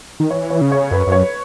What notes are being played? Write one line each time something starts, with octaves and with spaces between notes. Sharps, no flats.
D#3
E3 C#5
C#5
C#3
C#5
F#2 B4
F#2
C#5